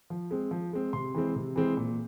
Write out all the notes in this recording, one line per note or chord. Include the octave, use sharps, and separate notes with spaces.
F3
G#3 C4
F3
G#3 C4
C3 C6
E3 G#3 C4
C3
E3 G#3 C4
A#2